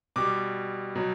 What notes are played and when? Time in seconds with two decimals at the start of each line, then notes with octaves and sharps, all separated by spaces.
0.16 B2 G3 D6
0.95 B2 F#3